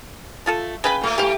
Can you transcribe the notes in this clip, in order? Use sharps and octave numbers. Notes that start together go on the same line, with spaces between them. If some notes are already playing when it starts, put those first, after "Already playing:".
A3 F4 A4
C#3 B4 G5 B5
A#2 A3 A#3
E3 A3 G4 F5